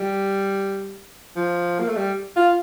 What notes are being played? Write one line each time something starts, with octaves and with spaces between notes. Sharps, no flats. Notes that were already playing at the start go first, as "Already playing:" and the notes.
Already playing: G3
F3
A#3
A3
G3
F4